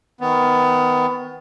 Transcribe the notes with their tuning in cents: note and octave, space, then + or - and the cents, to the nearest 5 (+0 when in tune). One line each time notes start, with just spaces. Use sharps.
D#3 +25 B3 +20